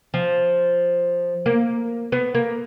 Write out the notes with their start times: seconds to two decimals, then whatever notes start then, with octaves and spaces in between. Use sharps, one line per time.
0.14 F3
1.46 A#3
2.12 B3
2.35 A#3